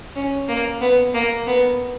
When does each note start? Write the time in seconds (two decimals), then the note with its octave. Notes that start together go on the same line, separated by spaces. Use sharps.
0.16 C#4
0.48 A#3
0.81 B3
1.14 A#3
1.47 B3